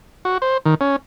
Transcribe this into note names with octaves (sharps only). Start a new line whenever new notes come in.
F#4
C5
D#3
C#4